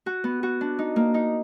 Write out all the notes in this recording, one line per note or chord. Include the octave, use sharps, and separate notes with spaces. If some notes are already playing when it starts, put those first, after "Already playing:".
F#4
B3
F#4
D4
D#4
A#3
D#4